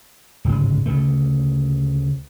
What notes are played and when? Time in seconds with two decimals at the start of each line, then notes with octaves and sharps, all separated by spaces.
0.45 D1 G#1 C#3 G#3
0.86 D2 C#3 A3